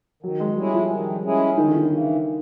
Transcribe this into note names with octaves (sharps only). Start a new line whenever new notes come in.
D#3 F#3
G#3
G3 G#3 C#4 E4 G#4
F3
D#3
G#3 C#4 E4 G#4
E2 D#3
D3
D#3
C#3 E3